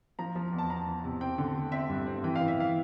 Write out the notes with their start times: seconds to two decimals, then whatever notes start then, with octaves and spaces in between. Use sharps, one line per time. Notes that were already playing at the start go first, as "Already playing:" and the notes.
0.19 F3 A#5
0.35 F3
0.52 E2
0.58 A5
0.70 E2 A#5
0.87 E2
1.04 C3
1.21 C4 G5
1.38 D3
1.55 A3
1.72 C4 E5
1.89 G2
2.07 C4
2.24 E3 G5
2.36 F5
2.41 E3
2.48 E5
2.58 E3 F5